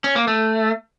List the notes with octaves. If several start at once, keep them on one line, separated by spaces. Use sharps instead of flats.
C#4
A#3
A3